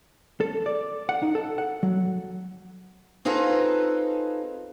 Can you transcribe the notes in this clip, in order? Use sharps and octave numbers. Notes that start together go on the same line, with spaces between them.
A4
D5
F#5
D#4
A4
F#5
F#3
C4 D#4 F4 G#4 A4 B4